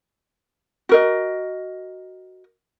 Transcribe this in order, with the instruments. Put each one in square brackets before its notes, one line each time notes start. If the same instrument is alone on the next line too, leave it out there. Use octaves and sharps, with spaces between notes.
[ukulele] F#4 A#4 D#5